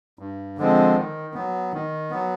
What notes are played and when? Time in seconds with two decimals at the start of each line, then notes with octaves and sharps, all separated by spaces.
0.19 G2
0.58 D3 F3 G#3 C4
0.96 D#3
1.34 F#3 B3
1.73 D#3
2.11 F#3 B3